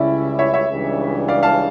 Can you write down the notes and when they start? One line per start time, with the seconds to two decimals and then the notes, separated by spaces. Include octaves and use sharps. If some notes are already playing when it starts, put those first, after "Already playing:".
Already playing: C#2 C#3 G3 C#4 E4 D5
0.39 C#5 E5
0.54 C#5 E5
0.68 C#2 C#3 E3 G3 D4
1.28 D5 F5
1.43 F5 A5